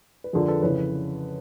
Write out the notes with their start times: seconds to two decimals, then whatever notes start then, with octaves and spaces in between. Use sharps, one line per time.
0.24 B4
0.33 F2 D3 F3 G#4 A#4
0.48 A4 B4
0.62 F2 C#3 E3 B4 C#5